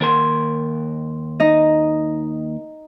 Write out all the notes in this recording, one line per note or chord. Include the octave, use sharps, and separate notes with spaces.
D#2 A#4 C6
D#4 D#5